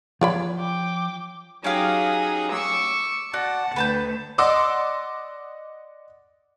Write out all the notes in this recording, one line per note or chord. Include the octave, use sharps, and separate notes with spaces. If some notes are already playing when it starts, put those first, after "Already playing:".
F3 F4 C#5 D5 B5
G5 D6
F#3 C#4 D#4 G4 G#4 F5
C#6 D6 E6
F#4 D5 F#5 A5
D2 B4 A5 G6
D5 D#5 F#5 C6 D6 E6